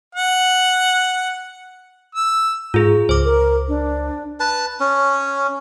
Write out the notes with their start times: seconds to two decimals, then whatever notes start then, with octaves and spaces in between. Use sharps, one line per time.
0.15 F#5
2.15 E6
2.74 G#2 F4 G#4
3.09 C#2 C5 D6
3.25 A#4
3.68 D4
4.40 B4 A5
4.80 C#4